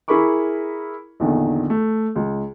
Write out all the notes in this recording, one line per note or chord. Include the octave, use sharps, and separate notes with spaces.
E4 G#4 A#4 B5 C#6 D6
A#1 E2 D3 D#3
A3
C#2